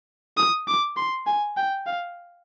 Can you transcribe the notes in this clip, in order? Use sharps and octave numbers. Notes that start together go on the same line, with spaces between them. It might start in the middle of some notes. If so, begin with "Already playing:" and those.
D#6
D6
C6
G#5
G5
F5